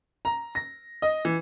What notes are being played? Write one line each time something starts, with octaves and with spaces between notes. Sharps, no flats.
A#5
A#6
D#5
E3